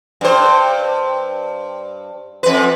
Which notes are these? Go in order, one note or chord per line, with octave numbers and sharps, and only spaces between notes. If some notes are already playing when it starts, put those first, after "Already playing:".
G2 C5
F2 B4